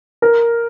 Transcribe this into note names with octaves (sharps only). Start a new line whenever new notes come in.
A#4